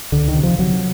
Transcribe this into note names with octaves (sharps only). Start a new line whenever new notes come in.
C#2 D3
D#3
C3
F3
C3 F#3